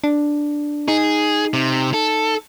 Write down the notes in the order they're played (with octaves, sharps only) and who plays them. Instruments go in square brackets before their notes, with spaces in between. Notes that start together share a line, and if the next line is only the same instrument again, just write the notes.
[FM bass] D4
[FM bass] D#4 [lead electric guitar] G#4
[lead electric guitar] C3
A4